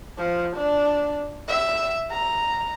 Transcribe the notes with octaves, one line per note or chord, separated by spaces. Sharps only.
F3
D4
E5
A#5